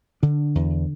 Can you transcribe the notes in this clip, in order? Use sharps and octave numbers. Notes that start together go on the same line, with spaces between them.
D3 D4
E2